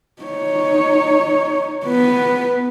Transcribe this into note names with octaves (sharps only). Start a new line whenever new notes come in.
D#4 C#5
B3 B4